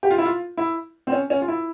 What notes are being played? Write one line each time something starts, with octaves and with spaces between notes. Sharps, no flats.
G4
F4
E4
F4
E4
C4
C#4
C#4
F4
E4